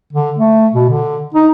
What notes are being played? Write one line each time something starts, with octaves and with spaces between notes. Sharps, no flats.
D3
A3
B2
D3
D#4